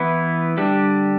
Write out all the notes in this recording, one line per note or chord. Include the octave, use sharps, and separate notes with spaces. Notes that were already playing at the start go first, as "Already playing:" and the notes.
Already playing: E3 B3 E4 B4
D3 G3 D4 G4